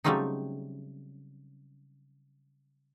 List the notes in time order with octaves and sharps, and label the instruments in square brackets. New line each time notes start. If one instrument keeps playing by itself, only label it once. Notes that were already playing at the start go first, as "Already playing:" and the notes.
[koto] C#3 F#3 G3 A3 C4 D#4